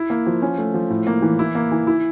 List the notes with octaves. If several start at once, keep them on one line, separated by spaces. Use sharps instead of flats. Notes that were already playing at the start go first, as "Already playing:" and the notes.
Already playing: E4
A#3
F3
C#4
A3
F3
A2
A#3
E3
E4
A#3
E3
E4